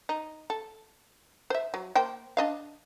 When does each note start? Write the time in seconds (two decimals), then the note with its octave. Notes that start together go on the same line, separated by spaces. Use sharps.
0.09 D#4
0.50 A4
1.50 C5 E5
1.74 F#3
1.96 A#3 C5 G5
2.37 D4 D#5 F5